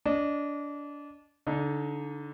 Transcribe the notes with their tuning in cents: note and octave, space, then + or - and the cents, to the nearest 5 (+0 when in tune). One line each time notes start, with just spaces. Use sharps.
D4 -25 D#5 -30
D3 -25 D#4 +0